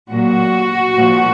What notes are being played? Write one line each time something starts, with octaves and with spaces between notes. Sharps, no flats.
A#2 F#3 F#4
A#2 F3